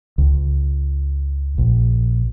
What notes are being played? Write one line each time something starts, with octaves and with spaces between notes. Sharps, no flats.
C#2
A#1